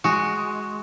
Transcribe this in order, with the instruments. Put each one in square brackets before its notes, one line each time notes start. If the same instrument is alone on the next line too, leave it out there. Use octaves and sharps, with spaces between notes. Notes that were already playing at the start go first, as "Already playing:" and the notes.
[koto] G#3 F#4